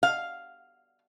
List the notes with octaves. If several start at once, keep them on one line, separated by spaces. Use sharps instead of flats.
F5